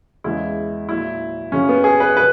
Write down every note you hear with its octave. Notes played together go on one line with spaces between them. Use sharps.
E2 C#3 G#3 E4
A#2 F#3 E4
F#2 C#3 F#3 C#4
B3
G#4
B4
B2 B4